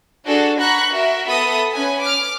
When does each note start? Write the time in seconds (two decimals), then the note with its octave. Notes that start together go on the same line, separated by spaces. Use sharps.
0.26 D4 F#4 G#4 A4
0.61 F#5 A#5 B5 C#6 F#6
0.92 F#4 A#4 E5
1.27 B3 A4 E5 B5 D#6
1.74 C#4 B4 G#5
2.04 D6 F6